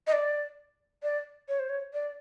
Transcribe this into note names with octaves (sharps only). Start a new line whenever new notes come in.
D#5
D5
D5
C#5
C5
C#5
D5